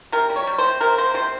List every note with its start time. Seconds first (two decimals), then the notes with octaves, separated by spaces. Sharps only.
0.12 C3 A#4
0.29 G3
0.36 C#5
0.47 G3
0.58 C5
0.64 C3
0.80 C3 A#4
0.98 A#3 C5
1.14 C3 C5